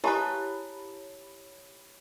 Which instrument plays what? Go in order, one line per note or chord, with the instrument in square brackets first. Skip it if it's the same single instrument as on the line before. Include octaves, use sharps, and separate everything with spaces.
[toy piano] E4 G4 A5 [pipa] G#4 B4 [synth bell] C#5 B5